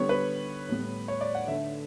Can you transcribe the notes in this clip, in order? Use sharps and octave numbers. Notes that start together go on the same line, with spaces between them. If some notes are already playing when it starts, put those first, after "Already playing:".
Already playing: D3 G3 B3 C#5
B4
A2 G3 B3
C#5
D5
F#5
D3 A3 E5